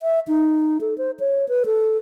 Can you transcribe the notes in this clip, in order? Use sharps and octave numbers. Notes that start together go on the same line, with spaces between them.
E5
D#4
A4
C5
C#5
B4
A4